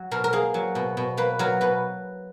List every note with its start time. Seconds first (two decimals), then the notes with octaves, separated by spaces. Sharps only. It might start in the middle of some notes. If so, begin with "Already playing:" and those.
Already playing: F#3
0.11 B2 A#4
0.24 A#4
0.33 A#3 G#4
0.54 F#3
0.75 B2
0.97 B2
1.17 A#3 B4
1.39 F#3 A#4
1.61 B2 B4